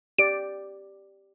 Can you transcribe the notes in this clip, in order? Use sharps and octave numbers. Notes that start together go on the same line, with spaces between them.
G4 D5 D7